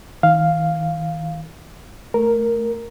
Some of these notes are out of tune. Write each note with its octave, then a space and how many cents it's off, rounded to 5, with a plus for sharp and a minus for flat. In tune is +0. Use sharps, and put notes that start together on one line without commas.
D#3 +45 F5 +0
A3 +0 A#4 +0